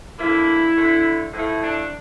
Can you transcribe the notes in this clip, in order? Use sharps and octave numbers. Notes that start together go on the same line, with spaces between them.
D3 F3 A#3 E4
D3 A3
A2 F3 A3 E4
D4